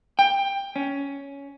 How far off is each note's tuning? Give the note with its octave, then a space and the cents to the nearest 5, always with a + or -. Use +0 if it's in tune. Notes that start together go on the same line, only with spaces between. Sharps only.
G5 +15
C#4 +10